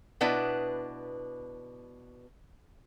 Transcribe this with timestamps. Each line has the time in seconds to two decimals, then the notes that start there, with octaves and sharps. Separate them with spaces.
0.21 B2 B3 D4 E4 B4 D5